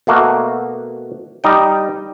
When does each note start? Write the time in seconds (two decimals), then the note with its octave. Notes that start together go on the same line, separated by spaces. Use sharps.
0.07 B2 A3 A#3 F#4
1.44 G3 D#4 G5